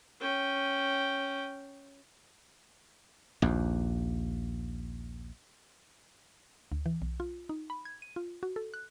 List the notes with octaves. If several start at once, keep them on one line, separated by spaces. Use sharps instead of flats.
C#4 G5
A#1 D#2
D2
E3
B1
F4
D#4
B5
G#6
D#7
F4
F#4
A4
F#6